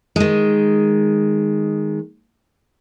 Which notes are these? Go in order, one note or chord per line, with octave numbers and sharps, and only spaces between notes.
D#3 G#3